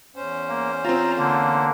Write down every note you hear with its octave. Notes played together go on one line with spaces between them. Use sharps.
E2 C#4 C5
A#3
C4 F4 A#5
D3 A#3